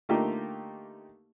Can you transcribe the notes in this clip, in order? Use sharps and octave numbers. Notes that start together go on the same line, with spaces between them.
D3 A3 A#3 D#4 F4 G4